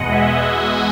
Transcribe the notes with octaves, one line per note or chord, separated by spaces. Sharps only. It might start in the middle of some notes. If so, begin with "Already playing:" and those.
Already playing: E2 B2 G#3 D#5 F#5
E5 G#5